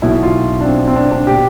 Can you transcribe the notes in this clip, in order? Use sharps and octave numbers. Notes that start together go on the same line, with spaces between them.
B1 B2 E4
F4
D4
C4
C4
D4
D4
B2 G4